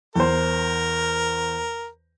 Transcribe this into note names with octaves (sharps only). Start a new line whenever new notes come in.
E2 A#4 C5